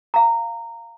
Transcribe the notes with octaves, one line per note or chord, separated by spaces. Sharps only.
F5 A#5